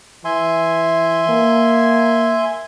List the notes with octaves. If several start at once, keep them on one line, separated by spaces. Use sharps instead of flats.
E3 E5 G#5 C6
A#3